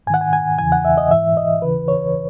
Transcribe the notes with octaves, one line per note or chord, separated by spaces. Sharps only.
G#2 D#3 F#5 G#5
G#5
G#5
E2 C#3 E3 G#5
F#5
E5
D#5
G#2 E3 E5
D#5
D#2 C#3 E3 B4
C#5